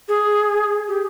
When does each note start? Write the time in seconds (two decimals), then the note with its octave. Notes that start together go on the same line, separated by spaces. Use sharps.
0.08 G#4
0.88 G4